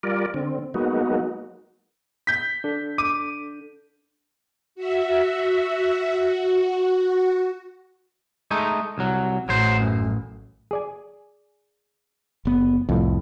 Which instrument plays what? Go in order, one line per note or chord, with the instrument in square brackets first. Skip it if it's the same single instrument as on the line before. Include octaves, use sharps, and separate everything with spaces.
[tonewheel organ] G3 F4 A#4 D5
D3 C4
F#3 G#3 A#3 B3 D#4 F#4
[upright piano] G6 B6
[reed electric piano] D4 A4
[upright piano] D6 D#7
[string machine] F#4 E5
F#4
[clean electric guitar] G#3 A3 D#4
C2 F#3
[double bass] A1 [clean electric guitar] F#3 C5
[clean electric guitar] F#2
[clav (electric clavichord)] G#4 D5 G#5
[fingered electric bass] F#1 B3
[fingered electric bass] C2 [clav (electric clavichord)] F2 A2